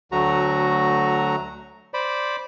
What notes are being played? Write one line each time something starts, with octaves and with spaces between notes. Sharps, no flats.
D2 F#3 A3 F#4 A#5
C5 D5 B5